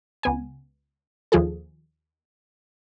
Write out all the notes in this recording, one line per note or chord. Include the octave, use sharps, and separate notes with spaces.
C#2 B3 G#5
D#2 F3 F4 G#4 A4